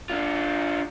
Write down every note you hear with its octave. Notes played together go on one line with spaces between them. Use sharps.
D4 F4